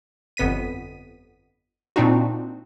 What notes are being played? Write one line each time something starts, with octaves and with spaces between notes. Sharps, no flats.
G1 F2 B3 B6 D#7
A#2 C4 D4 D#4 F#4